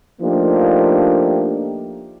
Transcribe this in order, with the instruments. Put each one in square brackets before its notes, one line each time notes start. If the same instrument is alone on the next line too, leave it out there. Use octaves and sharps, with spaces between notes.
[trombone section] F3 A3 A#3 D4 D#4 G4